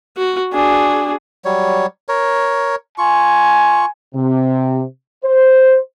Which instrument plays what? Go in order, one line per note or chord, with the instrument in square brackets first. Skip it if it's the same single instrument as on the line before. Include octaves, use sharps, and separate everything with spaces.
[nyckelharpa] F#4
[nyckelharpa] D4 F#4 [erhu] G#4
[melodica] F#3 G3 C#5
A#4 C#5
[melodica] F4 C#6 [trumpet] G#5
[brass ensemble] C3
C5